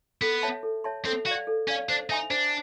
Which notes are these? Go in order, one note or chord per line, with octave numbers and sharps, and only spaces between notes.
B3 A4
C#5 E5 A5 C6
A4
C#5 E5 A5 C6
C4 A4
F#4 D5 F5
A4
C#4 D5 F5
D4 C5
D#4 E5 G#5 C6
D4 C5